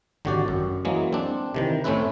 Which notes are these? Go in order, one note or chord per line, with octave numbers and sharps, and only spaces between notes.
G#1 D3 F#3 F#4 G4 D5
F#2
E3 F#3 G#3 A#3
C4 D4
C3 D#3 E3
A2 A3 C4 C#4 E4 B4